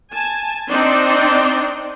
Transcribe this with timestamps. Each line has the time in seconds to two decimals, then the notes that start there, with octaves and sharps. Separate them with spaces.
0.13 G#5 A5
0.69 C4 D4 D#4 D5 C6